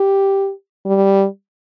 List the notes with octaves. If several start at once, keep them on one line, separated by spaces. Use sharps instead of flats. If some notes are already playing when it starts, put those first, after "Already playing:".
Already playing: G4
G3